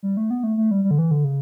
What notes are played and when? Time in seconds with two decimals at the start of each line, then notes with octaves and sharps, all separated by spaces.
0.03 G3
0.17 A3
0.30 B3
0.43 A3
0.57 A3
0.71 G3
0.84 G3
0.91 D3
0.99 E3
1.11 D3
1.24 C#3